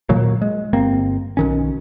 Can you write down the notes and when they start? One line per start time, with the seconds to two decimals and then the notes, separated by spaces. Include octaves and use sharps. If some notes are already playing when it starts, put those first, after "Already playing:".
0.09 A#2 D#3 F#3 A#3
0.42 G#3
0.73 G1 A#3 C4
1.37 B1 D#3 C#4